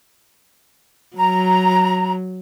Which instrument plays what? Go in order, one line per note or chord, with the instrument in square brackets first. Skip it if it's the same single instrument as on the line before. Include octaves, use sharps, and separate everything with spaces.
[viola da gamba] F#3 [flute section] A#5